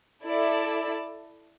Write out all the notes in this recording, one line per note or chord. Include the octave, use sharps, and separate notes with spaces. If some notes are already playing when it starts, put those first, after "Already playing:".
E4 A4 D5 A5